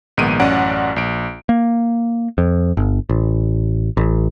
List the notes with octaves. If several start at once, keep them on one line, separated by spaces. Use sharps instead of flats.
A#1 G#2 D#3 B3 D7 D#7
A1 F#2 C#4 D5 F#5 D7
A#1 D7
A#3
F2
G1
A1
A1